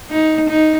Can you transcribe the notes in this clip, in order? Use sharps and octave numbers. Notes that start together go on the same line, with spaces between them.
D#4
D#4